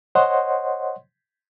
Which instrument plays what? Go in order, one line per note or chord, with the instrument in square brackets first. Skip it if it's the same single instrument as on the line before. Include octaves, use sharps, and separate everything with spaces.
[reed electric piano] C5 C#5 D#5 F#5 C6